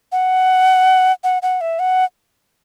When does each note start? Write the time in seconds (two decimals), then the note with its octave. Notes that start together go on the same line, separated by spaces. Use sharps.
0.12 F#5
1.24 F#5
1.42 F#5
1.61 E5
1.79 F#5